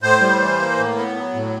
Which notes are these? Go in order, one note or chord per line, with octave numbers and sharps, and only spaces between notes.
A2 C5
G3
E3
A#3
A2
B3
F#3
A2